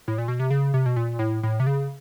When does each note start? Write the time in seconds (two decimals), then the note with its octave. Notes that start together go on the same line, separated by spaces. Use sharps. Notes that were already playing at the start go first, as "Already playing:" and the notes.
0.08 A2
0.18 A#2
0.28 B2
0.40 C3
0.51 C#3
0.74 C3
0.86 B2
0.96 A#2
1.19 A2
1.43 A2
1.60 C3
1.67 C#3